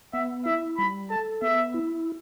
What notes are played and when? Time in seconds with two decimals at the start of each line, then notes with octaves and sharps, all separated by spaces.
0.13 B3 E5
0.45 E4 E5
0.77 G3 B5
1.10 A4 A5
1.42 B3 E5
1.74 E4